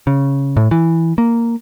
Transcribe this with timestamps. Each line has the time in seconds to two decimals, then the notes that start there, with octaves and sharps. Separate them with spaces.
0.07 C#3
0.57 A2
0.71 E3
1.18 A#3